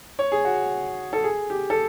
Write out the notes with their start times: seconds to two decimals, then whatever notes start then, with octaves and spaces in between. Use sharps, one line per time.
0.19 C#5
0.32 G#4
0.45 F#4
1.13 A4
1.24 G#4
1.50 G4
1.70 A4